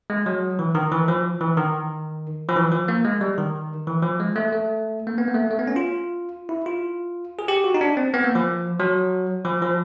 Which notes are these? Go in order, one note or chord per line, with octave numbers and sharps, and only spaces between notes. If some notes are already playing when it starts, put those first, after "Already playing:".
G#3
F#3
E3
D#3
E3
F3
E3
D#3
F3
E3
F3
A#3
G#3
G3
D#3
E3
F3
G#3
A3
A3
A#3
B3
A#3
A3
A3
B3
C#4
F4
E4
F4
G#4
G4
F#4
D#4
D4
C4
B3
A#3
F3
F#3
F3
F3